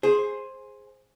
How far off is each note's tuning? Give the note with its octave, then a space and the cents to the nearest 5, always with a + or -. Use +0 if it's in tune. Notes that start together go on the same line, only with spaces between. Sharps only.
G#4 +0 C5 +10